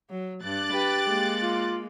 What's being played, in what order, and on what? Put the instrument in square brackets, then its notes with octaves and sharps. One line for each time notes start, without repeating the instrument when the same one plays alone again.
[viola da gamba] F#3
[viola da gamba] G2 [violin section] D6 F#6 A6
[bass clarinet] G4 [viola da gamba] B4
[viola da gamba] G#3 A#3
[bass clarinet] F4